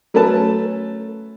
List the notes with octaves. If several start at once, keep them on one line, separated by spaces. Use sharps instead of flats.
F#3 A3 C#4 B4 A5